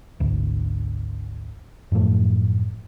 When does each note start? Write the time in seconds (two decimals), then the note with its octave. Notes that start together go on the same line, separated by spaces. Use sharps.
0.20 G#1 D2
1.92 F#2 A2 F3 A3